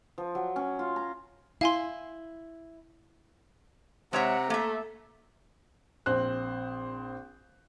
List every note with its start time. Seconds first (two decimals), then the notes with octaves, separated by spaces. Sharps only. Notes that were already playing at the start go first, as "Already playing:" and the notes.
0.18 F3
0.35 F#3
0.56 C#4
0.79 F4
0.96 A#5
1.61 E4 F5 G#5 C6
4.13 C3 G#3 C#5 E5 F#5 A#5
4.50 A3 A#3 E5
6.06 A#1 C4 C5 F#6